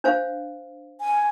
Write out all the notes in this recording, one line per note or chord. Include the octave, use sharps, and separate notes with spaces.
D4 C5 F5
G#5